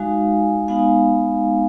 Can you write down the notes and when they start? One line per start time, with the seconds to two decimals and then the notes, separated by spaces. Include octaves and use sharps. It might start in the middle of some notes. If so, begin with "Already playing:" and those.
Already playing: G#3 D#4 F#4 F5 G#5
0.68 G#3 B3 D#4 F5 G#5